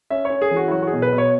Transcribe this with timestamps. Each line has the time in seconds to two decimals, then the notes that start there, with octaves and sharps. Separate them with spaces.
0.10 C#4 E5
0.25 C#5
0.30 C#4
0.42 G#4
0.51 E3
0.56 F#4
0.67 E4
0.71 F#3 F#4
0.82 F#4
0.87 G#4
0.93 B2
1.02 B4
1.13 B2
1.18 C#5